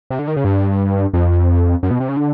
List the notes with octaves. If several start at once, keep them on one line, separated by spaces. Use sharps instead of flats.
C3
D3
D#3
C#3
G2
F2
F#2
B2
C3
C#3
D3